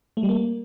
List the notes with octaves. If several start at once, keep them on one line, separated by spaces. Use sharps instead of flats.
A3
G3
A#3